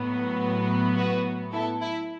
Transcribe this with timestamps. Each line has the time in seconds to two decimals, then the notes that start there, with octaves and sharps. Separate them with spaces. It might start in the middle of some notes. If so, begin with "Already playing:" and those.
Already playing: A2 F#3 B3
0.96 F#4 B4
1.53 E4 A4
1.81 E4